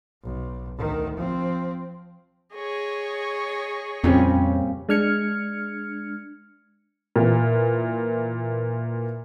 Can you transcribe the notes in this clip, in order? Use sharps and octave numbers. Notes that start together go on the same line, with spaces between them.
B1
D2 D#3
F3 C4
G#4 C#5 D#5
F2 A#2 C#3 G3 C4 C#4
G#3 D4 F6 G#6 C#7
A#2 E3